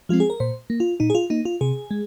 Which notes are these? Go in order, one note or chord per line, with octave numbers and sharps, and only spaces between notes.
F3 G#3 C4 F4
G#4
A#4
A#2 C5
A#3
F4
A#2 D#4
G#4
F4
A#3 D#4
F4
C3 G#4
G#3